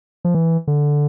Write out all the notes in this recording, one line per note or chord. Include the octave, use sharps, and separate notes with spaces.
F3
E3
D3